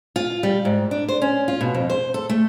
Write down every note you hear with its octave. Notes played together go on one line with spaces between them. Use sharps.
F4
G3
G#2
D4
C5
C#4
F4
B2
F2
C5
A4
A3